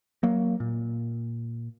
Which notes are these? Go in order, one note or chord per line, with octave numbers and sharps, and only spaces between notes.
F#3 A#3
A#2